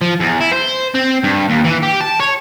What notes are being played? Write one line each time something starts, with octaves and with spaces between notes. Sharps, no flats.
F3
E2
E4
C5
C4
G2
D#2
E3
G4
A5
C#5